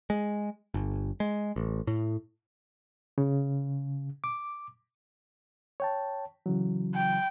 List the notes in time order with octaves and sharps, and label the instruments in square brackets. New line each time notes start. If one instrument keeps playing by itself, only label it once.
[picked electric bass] G#3
G1
G#3
A1
A2
[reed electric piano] C#3
D6
C#5 G5 A5
C#3 E3 F#3
[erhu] G5